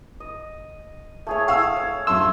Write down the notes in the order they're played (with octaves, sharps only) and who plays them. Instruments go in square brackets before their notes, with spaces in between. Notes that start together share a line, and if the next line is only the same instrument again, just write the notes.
[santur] D#5
A3 G#4 C#5
[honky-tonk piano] F5 E6
[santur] C#5
[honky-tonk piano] F#2 C6 [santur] A3 [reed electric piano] E6